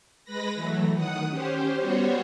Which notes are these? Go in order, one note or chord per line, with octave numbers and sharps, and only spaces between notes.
G#3 B4 B5 A#6
E3 F#3 A3
D#3 F#5 D#6
C#4 G4 C5
G3 B3 F#4 C5 C#5